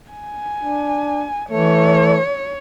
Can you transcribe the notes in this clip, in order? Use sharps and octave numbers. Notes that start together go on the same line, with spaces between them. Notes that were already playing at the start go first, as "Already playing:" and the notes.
G#5
D4
E3 A3 C#5